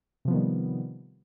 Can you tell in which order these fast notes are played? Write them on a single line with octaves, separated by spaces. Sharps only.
C3 F3 B3 D#3 G3